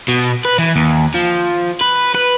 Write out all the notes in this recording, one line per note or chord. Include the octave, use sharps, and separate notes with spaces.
B2
B4
E3
D#2
F3
B4
B4